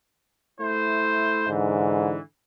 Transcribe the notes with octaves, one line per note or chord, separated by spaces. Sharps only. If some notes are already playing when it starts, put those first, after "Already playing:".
A3 E4 C5
G#2 D3 E3